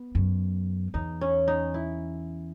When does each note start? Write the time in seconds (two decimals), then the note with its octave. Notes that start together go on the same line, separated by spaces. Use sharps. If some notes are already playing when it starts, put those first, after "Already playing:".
Already playing: B3
0.15 F#2
0.94 E2 D#4
1.21 C#4
1.48 D#4
1.74 E4